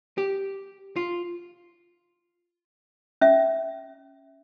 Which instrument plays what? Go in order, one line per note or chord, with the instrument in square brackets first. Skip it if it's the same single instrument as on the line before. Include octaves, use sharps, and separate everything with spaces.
[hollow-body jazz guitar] G4
F4
[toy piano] C#4 E5